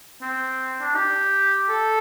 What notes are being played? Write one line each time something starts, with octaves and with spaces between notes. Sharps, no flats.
C4
D4
G4
A4